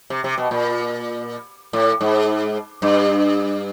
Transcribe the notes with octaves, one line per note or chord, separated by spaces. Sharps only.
C3
C3
B2
A#2
A2
G#2
G2